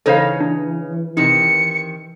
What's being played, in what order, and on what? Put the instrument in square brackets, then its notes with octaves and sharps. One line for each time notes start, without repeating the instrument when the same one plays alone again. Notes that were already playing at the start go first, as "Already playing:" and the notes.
[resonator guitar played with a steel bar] C#3 D#4 C#5 [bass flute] E3 [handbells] A4 C5 F5
[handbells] D4
[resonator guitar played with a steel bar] C3 D#3 [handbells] D#4 [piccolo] C#7